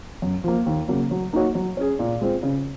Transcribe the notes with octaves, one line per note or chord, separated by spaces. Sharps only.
F#2
F3 A#3
D#2
C#3 F#3 A#3
F#3
A#3 D#4 F#4 C#5
F#3
C#4 G#4
A#2
G#3 C4 F4
C#3